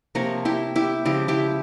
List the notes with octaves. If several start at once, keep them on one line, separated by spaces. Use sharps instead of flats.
C3 F3 A#3 A#4 C#5
E4 G4
E4 G4
C#3 F3 G#3 E4 G4
E4 G4